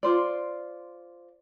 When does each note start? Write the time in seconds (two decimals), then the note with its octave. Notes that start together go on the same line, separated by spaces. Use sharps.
0.03 F4 C5 D5